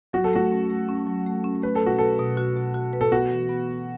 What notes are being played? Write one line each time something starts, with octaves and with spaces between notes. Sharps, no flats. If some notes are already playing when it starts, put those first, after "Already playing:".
F#3 F#4
A4
A3 F#4
C#4
A3
C#4
F#3
A3
C#4
A3 B4
A4
B2 F#4
A4 B4
B2
F#4
B2
F#4
B4
A4
B3 F#4
E3
B3
B3